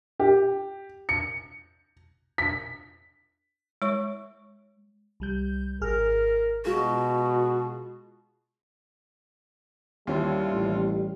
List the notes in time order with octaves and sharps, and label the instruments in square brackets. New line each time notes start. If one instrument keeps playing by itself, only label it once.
[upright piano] G4
C#7
B6
[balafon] G#3 C#5 C#6
[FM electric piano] C2 G3 G6
[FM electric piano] G#1 G#4 F6 [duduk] A#4
[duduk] B2 [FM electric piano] G#3 F4 G#4 [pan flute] F#4
[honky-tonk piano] D#2 C#4 E4 [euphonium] G3 [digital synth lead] F4
[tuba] A1